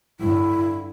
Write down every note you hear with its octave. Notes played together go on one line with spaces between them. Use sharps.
G2 D3 E4